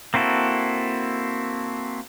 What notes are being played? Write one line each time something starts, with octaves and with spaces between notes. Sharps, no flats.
A#3 C4 E4 F#4 A4